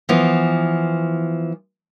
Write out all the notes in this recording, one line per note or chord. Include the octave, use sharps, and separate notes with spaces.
E3 F3 B3